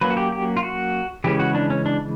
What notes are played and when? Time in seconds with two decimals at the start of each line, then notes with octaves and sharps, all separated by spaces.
0.01 F#3 A#3 C#4 B4
0.10 F#4
0.17 G4
0.32 G4
0.57 F4
0.63 F#4
1.24 C#3 E3 G#3 C#4 G4
1.39 F#4
1.55 D4
1.70 C#4
1.86 D4